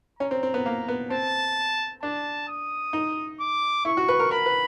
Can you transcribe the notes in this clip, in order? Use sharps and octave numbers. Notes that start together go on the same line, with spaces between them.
C#4 A#5
C4
C4
B3
A#3
B3
C4 A5
D4 A5
D#6
D#4
D6
E4 C#6
F#4
B4
A#4
A#4 B5
B4